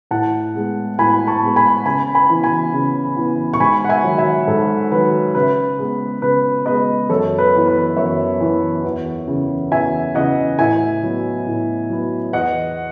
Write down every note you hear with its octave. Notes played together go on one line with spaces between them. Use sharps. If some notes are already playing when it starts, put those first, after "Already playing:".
A2 F#5 A5
G#3 B3
A2 G#5 B5
A5 C#6
G#3 B3
G#5 B5
C#3 G#5 B5
G#5 B5
E3 B3
G#5 B5
C#3
E3 B3
C#6
G#2 G#5 B5
F#5
E5 G#5
D#3 F#3
E5 G#5
G#2 A4
D#3 F#3 B4
C#3 B4
G#3 B3
C#3 B4
G#3 B3 B4 D#5
F#2 A4 C#5
B4
E3 B3
B4
F#2 C#5 E5
E3 B3
E2
C#3 E3
E2 E5 G#5
C#3 E3 D#5 F#5
A2 E5 G#5
F#3 B3
A2
F#3 B3
E2 D#5 F#5